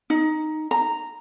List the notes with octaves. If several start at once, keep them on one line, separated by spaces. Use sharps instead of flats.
D#4
A#5